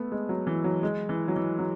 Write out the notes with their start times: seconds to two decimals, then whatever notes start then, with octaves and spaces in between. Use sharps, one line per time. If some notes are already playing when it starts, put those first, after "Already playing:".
Already playing: A3 B3
0.12 G#3
0.29 F#3
0.47 E3
0.64 F#3
0.83 G#3
1.09 E3
1.28 F#3
1.36 E3
1.59 F#3